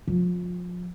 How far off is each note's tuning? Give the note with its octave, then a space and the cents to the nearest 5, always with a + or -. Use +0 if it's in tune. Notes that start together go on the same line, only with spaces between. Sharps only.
F3 +30